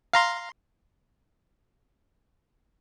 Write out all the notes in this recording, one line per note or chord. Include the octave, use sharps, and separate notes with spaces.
F5 A#5 C6